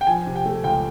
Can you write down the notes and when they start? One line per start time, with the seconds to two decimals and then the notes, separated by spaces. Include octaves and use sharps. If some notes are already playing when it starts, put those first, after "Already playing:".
0.01 G5
0.07 F3 G#5
0.26 C3
0.36 G5
0.46 A3
0.64 C#2 G5